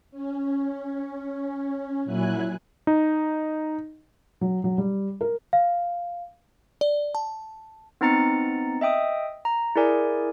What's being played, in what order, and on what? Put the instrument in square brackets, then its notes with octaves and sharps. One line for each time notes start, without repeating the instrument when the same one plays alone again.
[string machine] C#4
A#2 F#3 E4 G#5 F#6
[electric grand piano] D#4
[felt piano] F#3
F#3
G3
A#4
[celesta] F5
[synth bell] D5
A5
[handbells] B3 C4 D#4 A#5 A6 C#7
D#5 E5 G5 D#6
A#5
E4 G#4 A#4 D5 G#5